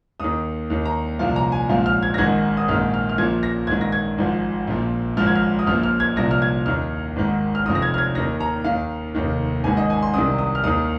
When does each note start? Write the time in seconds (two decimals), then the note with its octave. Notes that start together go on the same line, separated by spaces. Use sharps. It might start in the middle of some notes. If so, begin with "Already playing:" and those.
0.20 D#2 D#3 D#6
0.70 D#2 D#3
0.85 A#5
1.19 C2 A#2 F3 F5
1.36 A#5
1.52 G#5
1.69 A#1 G#2 F3 F5
1.86 F6
2.03 G#6
2.14 A#6
2.18 G#1 G#2 D#3 G#6
2.57 D#6
2.68 A#1 G#2 D#3 F6
2.94 F6
3.09 F6
3.18 A#1 A#2 F3 G#6
3.43 A#6
3.67 A#1 G#2 D#3 G#6
3.81 A#6
3.92 G#6
4.18 G#1 G#2 F3
4.67 A#1 A#2 F3
5.17 G#1 G#2 F3 F6
5.27 G#6
5.35 F6
5.59 D#6
5.67 A#1 A#2 F3 F6
5.83 F6
6.00 G#6
6.16 C2 A#2 F3 A#6
6.31 F6
6.42 G#6
6.66 D#2 D#3 F6
7.16 G#1 G#2 D#3
7.55 F6
7.66 F1 F2 F3 D#6
7.75 A#6
7.82 G#6
7.94 F6
7.98 G#6
8.15 D#2 D#3 A#6
8.40 A#5
8.64 D#2 D#3 F5
9.15 F1 D#2 D#3
9.64 G#1 G#2 D#3 G#5
9.77 D#5
9.90 G#5
10.02 C6
10.14 C2 C3 D#3 D#6
10.39 D#6
10.55 F6
10.63 D#2 D#3 D#6